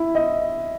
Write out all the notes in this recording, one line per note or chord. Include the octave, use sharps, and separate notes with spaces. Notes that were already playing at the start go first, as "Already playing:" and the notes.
Already playing: E4
D#5